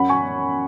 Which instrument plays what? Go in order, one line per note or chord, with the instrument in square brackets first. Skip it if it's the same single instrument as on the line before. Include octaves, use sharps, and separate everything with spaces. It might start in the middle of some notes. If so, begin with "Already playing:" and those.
Already playing: [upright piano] F#2 F#5 B5
G#5 C#6